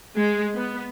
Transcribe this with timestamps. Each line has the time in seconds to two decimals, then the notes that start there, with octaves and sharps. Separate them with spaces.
0.18 G#3
0.55 B3